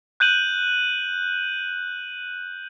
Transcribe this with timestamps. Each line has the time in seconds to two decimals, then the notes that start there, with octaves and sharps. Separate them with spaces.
0.20 F#6 G6 D#7 F#7